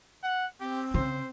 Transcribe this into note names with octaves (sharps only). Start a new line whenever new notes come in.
F#5
C4 G4
C#3 C5